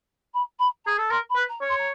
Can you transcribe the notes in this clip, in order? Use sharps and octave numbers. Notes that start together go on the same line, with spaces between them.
B5
B5
G#4 A#5
A4
A#4 C6
B5
B4
A#5
C#5
C6
A#5